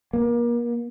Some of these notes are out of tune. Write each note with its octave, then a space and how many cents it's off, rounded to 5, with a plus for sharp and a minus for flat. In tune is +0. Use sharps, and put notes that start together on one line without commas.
A#3 +35